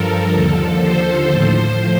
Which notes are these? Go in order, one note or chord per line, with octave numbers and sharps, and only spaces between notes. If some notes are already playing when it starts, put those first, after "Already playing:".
Already playing: G2 F3 A4 A#4
D#2 D3 F3
C5
A2 F3